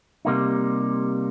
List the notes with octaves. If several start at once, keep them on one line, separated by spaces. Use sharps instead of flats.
C3 G3 A#3 D#4